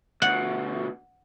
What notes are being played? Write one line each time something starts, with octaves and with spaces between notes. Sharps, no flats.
D2 B2 F#5